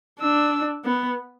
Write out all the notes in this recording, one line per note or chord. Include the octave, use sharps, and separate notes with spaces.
D4 E6
B3